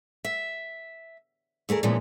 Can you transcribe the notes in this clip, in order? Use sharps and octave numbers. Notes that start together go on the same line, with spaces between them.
E5
E2 A3 G#4 A#4
A#2 C#3 E3 F3 G#3 B3